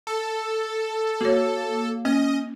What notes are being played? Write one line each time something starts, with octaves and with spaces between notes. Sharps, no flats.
A4
A#3 F#4 C#5
A#3 C#4 D#5